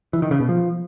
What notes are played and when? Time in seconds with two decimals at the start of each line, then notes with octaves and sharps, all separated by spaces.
0.13 E3
0.22 D#3
0.31 C#3
0.40 B2
0.49 F3